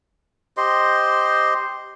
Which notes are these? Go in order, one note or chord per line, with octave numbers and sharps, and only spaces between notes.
G4 C5 D#5 C6